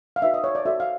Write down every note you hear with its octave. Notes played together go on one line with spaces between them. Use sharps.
F5
D#4 F#4 B4 E5
D#5
C#5
D5
F#4 A4 C5 E5
F5